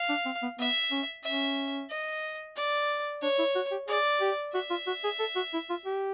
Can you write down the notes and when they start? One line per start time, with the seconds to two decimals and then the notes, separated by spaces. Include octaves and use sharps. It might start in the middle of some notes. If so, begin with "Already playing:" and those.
Already playing: F5
0.09 D4
0.25 C4
0.42 B3
0.59 B3 E5
0.91 C#4
1.24 C#4 E5
1.90 D#5
2.56 D5
3.22 D4 C#5
3.39 E4
3.55 F#4
3.71 G4
3.88 G#4 D5
4.21 G4
4.54 F#4 E5
4.70 F4
4.87 F#4
5.04 G#4
5.19 A4
5.36 F#4
5.53 E4
5.70 F4
5.86 G4